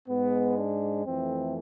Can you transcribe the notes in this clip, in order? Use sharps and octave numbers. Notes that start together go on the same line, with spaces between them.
G#2 G#3 B3
D4
F2 E3 A3 C4